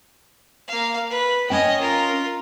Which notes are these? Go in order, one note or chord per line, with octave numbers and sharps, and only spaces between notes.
A#3 F5
B4
C#4 C#5 D#5 G5
F4 A#4